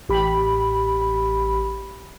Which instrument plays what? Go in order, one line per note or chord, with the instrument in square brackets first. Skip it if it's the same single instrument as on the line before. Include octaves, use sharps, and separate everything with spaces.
[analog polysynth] A1 G4 B5